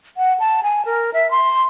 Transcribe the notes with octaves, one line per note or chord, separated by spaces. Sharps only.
F#5
A5
G#5
A#4
E5
C6